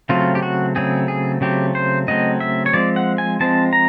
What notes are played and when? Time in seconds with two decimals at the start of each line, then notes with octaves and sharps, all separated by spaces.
0.09 C#3 F#3 A3 C4 F4
0.35 G4
0.42 F#4
0.75 C#3 F#3 A3 C4 G#4
1.08 G#4
1.41 C#3 F#3 A3 C4 G4
1.75 C5
2.08 C#3 F#3 A3 C4 D#5
2.40 E5
2.66 C#5
2.74 F3 G#3 C4 D5
2.96 F#5
3.18 G#5
3.40 F3 G#3 C4 A5
3.73 A#5